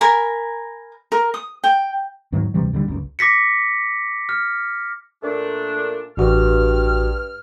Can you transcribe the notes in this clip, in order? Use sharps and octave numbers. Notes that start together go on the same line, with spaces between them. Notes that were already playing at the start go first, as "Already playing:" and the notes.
A#4 G#5 B5
A#4
D#6
G5
E2 G#2 D#3 F#3
D2 C3 E3 G3
D#2 D3 F3 G3
F#1 C#2
D6 A#6 B6 C#7
F6
A#2 A3 D4
A1 G2 F#4 F6